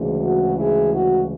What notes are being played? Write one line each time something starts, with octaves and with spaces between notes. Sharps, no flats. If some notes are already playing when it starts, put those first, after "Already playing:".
Already playing: D2 C#3 E3 G#3
F#4
E4 G#4
F#4